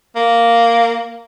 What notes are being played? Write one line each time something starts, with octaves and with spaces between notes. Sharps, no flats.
A#3